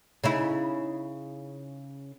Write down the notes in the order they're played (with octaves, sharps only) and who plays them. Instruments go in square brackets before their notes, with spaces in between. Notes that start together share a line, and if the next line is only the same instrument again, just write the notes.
[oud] C#3 D#4 E4